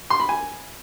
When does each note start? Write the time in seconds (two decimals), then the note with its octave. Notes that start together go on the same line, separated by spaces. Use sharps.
0.10 C6
0.20 B5
0.29 G#5